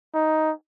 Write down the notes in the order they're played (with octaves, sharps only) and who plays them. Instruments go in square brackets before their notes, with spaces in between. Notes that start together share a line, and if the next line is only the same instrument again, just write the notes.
[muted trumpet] D#4